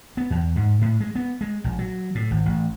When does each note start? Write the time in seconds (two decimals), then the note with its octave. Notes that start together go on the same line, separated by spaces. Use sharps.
0.17 B3
0.30 E2
0.56 G#2
0.81 A2
1.00 G#3
1.15 B3
1.41 G#3
1.64 A#1
1.79 F#3
2.15 A2
2.31 G#1
2.46 A1